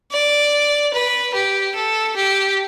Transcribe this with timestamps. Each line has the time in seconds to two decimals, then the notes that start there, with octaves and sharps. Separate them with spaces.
0.12 D5
0.94 B4
1.34 G4
1.75 A4
2.16 G4